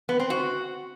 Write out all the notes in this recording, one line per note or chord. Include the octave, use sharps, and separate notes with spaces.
B3
C4
F#4